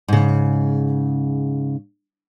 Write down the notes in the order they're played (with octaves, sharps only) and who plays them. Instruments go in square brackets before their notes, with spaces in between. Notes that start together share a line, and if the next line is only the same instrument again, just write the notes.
[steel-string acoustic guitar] G#2 C#3